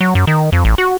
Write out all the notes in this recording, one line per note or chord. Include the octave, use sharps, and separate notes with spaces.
F#3
F#2
D#3
F2
A1
F#4